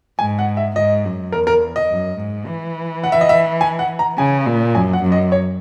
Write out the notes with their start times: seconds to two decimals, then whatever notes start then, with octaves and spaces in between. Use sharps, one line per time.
0.19 G#2 G#5
0.39 F#5
0.57 E5
0.76 G#2 D#5
1.05 F#2
1.32 E2 A#4
1.47 A#4
1.76 D#5
1.90 F#2
2.18 G#2
2.47 E3
3.04 F#5
3.12 E5
3.21 D#5
3.29 E5
3.61 G#5
3.79 F#5
3.99 A#5
4.18 C#3 G#5
4.46 A#2
4.75 F#2 G#5
4.93 F#5
5.03 F#2
5.12 D#5
5.32 C#5